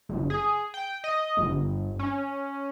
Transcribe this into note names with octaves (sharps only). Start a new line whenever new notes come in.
G1
G#4
G5
D#5
G1
C#4